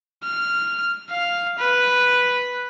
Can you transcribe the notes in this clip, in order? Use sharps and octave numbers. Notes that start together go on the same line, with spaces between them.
F6
F5
B4